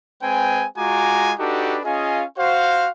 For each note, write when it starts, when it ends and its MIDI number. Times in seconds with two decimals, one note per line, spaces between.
0.23 0.66 56
0.23 0.66 60
0.23 0.66 71
0.23 0.66 79
0.23 0.66 80
0.78 1.33 56
0.78 1.33 65
0.78 1.33 66
0.78 1.33 80
0.78 1.33 82
0.78 1.33 86
1.40 1.79 62
1.40 1.79 63
1.40 1.79 66
1.40 1.79 67
1.40 1.79 69
1.40 1.79 71
1.85 2.24 61
1.85 2.24 65
1.85 2.24 68
1.85 2.24 75
1.85 2.24 77
1.85 2.24 80
2.38 2.89 66
2.38 2.89 72
2.38 2.89 77